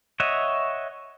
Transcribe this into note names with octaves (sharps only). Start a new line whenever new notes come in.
C#5 D#5 E5 F#5